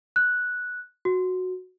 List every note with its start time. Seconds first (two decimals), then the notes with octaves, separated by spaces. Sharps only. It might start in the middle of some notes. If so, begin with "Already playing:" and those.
0.16 F#6
1.05 F#4